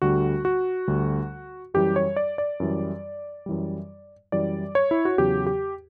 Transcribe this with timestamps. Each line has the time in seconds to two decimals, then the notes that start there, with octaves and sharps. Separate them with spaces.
0.02 D2 D3 G3 F#4
0.45 F#4
0.88 D2 D3 G3
1.74 F#2 E3 G3 G4
1.96 C#5
2.16 D5
2.38 D5
2.60 F#2 E3 G3
3.46 F#2 E3 G3
4.32 F#2 E3 G3 D5
4.75 C#5
4.91 E4
5.05 F#4
5.18 E2 C#3 F#3 G4
5.46 G4